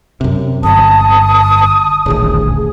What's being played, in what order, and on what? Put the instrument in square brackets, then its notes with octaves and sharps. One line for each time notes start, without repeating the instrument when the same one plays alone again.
[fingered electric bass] F#2 C3
[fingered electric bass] G1 [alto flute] A5 [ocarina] D#6
[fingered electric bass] D#1 A1 D2 [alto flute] G#4